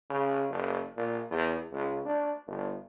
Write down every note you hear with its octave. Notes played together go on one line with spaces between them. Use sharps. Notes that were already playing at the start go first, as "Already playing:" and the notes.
C#3
F#1
A#2
E2
C#2
D4
G1